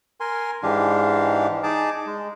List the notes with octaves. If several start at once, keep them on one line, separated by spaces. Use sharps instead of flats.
A#4 G#5 C6
G#2 E3 G#3 D4 G4 F5
D#4 G#4 A5 D6
G#3